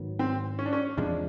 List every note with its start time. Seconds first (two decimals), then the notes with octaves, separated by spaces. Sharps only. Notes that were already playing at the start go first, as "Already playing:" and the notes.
Already playing: G#2 D#3 F#3 B3
0.19 C4
0.59 C#4
0.66 D4
0.73 C#4
0.97 E2 C3 F3 G#3 D4